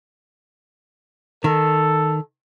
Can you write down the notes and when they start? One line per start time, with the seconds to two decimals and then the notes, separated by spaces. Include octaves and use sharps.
1.44 D#3 A4